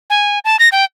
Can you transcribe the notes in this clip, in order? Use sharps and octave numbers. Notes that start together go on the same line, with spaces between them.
G#5
A5
A#6
G5